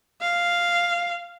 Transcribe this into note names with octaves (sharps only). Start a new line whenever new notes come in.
F5